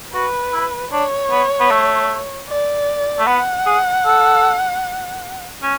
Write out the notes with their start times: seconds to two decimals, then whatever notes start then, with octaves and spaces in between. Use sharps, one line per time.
0.13 F#4 B4
0.53 E4
0.92 D4 C#5
1.31 B3
1.60 B3
1.71 A3
2.49 D5
3.19 A3
3.27 B3 F#5
3.66 G#4
4.06 A4
5.63 C#4